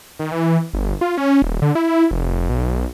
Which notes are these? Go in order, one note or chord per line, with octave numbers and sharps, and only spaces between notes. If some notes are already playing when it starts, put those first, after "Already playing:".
D#3
E3
G1
F4
C#4
D#1
D3
E4
F1
B1